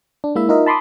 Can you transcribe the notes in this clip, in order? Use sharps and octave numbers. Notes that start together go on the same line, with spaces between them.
D4
G#3 A#3 E4 E5
D#4 F4 A#4 D#5 E5
A5 B5 C6 D6 D#6